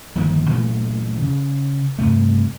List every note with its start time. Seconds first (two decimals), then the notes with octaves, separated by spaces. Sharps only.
0.15 G1 D#3 F3 A#3
0.49 A#2 E3 F#3 A3
1.22 C#3
1.99 G2 C3 A3